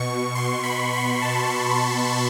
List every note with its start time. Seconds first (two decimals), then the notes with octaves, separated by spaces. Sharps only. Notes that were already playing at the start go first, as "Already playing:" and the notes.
Already playing: B2 C#6
0.35 C6
0.64 B5
0.93 B5
1.22 A5